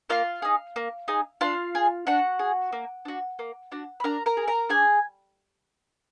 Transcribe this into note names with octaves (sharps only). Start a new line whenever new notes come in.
A#3 F4 F5
D#4 G#4
A#3
D#4 G#4
D4 F4 F5
G#4
D4 F#4 F#5
G#4
A#3
D4 F#4
A#3
D4 F#4
B5
D4 A#4 A#5
A#4 A#5
G#4
A#4 A#5
D4 G#4 G#5